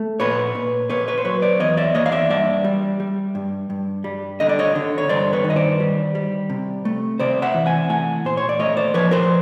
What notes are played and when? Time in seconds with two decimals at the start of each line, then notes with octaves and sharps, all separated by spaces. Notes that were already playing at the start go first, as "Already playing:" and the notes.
Already playing: A3
0.20 A#2 B4 C#5
0.55 A#2
0.90 A#3 B4 C#5
1.08 B4 C#5
1.18 C5
1.25 F#3 B4 C#5
1.42 C5 D5
1.60 E2 C#5 D#5
1.77 D5 E5
1.95 A#3 C#5 D#5
2.06 F5
2.12 D5 E5
2.30 G2 D5 E5
2.64 G3
3.00 G3
3.35 G2
3.70 G2
4.04 G3
4.40 D3 D#5
4.49 D5
4.59 C#5 D#5
4.75 D3
4.98 C#5
5.09 G2 C5 D5
5.33 B4 C#5
5.44 D#3
5.50 D#5
5.56 C5 D5
5.80 G3
6.15 G3
6.50 C3
6.85 A3
7.19 C3 C5 D5
7.42 E5 F#5
7.54 E3
7.66 F#5 G#5
7.89 A3 F#5 G#5
8.25 A#2 C5
8.37 C#5
8.49 D5
8.59 A3 C#5 D#5
8.77 C5 D5
8.94 F3 B4 C#5
9.11 A#4 C5